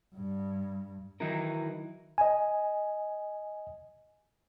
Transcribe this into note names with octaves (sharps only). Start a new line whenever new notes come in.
G2
D#3 E3 F#3 D#4 E4 A#4
D#5 G#5